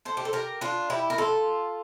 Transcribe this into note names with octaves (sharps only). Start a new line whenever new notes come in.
A4 C5
G4
A4
G4 A#4
D4 F4
E4 G4
A#4
F4 A4